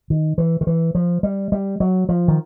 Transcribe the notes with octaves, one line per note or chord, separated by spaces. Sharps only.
D#3
E3
D#3
E3
F3
G3
G3
F#3
F3
D#3